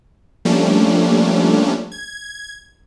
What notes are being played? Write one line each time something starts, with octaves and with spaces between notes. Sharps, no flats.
F3 G3 A3 A#3 C#4 D4
G#6